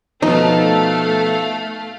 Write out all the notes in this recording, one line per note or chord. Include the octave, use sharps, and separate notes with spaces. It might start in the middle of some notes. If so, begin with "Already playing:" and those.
B2 F3 A3 D#4 A4 F5